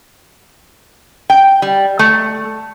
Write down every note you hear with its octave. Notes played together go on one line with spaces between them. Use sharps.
G5
G3
A3